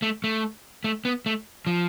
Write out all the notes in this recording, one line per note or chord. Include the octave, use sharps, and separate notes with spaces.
A3
A3
A3
B3
A3
F3